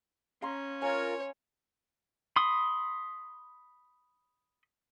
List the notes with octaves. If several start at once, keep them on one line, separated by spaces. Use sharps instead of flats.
C#4 F5 A#5 C6
F4 A#4 C#5 G#5
B5 C6 D#6